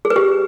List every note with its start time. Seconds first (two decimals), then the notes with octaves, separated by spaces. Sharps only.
0.05 G#4
0.10 B4
0.16 G4